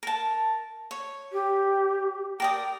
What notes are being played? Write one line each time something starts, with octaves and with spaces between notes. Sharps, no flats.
A#4 A5
C#5
G4
A#4 D5 G5 D#6